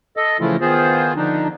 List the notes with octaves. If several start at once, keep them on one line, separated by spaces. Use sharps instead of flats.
A4 D#5
C#3 E3 F3 A3 E4 F4
D#3 B3 F4 G#4 C5
D3 F3 D4 D#4